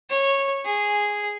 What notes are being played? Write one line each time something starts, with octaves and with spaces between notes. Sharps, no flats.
C#5
G#4